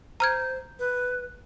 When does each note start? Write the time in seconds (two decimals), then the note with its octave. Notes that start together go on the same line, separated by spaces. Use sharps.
0.20 C5 A#5 F6 G#6
0.79 B4